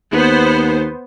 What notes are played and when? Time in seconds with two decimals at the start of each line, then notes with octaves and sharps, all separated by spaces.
0.13 D#2 B3 C5